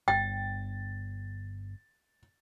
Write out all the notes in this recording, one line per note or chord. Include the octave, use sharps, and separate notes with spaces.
G1 G5 A6